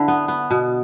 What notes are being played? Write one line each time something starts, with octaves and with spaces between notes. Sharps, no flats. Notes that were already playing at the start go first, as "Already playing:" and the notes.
Already playing: D3 E4
B3
B3
B2